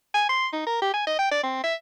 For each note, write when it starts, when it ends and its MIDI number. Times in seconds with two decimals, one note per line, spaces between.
0.14 0.25 80
0.29 0.47 84
0.53 0.63 63
0.67 0.78 70
0.82 0.93 67
0.94 1.04 80
1.07 1.18 75
1.19 1.30 79
1.31 1.43 74
1.44 1.60 60
1.63 1.74 76